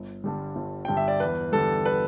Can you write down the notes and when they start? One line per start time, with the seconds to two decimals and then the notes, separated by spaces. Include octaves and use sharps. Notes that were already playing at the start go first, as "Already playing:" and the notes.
Already playing: G1
0.24 G2 D3 G3
0.56 G1
0.85 G2 D3 G3 G5
0.97 E5
1.08 D5
1.20 E2 B4
1.52 D3 G3 A4
1.86 B4